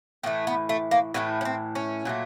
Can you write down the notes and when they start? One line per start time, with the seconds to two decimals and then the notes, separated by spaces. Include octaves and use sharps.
0.23 A2 E3 A3 C4
0.47 B3
0.69 A3
0.91 A#3
1.14 A2 E3 A3 B3
1.41 C#4
1.45 C4
1.75 C#4
2.05 A#2 F#3 A3